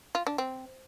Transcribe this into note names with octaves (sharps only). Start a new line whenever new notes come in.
F4
D4
C4